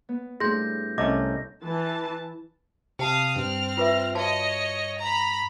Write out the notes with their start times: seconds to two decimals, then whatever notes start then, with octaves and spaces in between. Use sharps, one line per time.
0.09 B3
0.40 A2 G3 D4 G#4 C6 G6 A#6
0.98 C2 A3 C#4 D#5 D6 A#6
1.63 E3 A5
2.99 C3 F5 G5 A5 D#6
3.36 G2 C4 F6
3.77 F4 B4 E5
4.15 F#4 C#5 D#5 F5 A5
4.98 A#5 B5